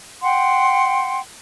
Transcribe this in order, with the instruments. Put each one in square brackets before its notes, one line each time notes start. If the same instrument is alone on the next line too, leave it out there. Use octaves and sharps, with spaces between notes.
[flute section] F#5 G5 C6